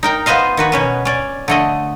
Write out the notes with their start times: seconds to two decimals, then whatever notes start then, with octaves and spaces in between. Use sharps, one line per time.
0.03 D#4 A#4 G5
0.26 B3 F4 B4 C5 D#5 F5
0.57 D#3 F#4 B4
0.72 B2 C#4 B4
1.05 C#4 D5
1.48 D3 A3 D#5